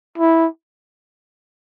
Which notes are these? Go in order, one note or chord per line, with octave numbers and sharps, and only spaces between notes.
E4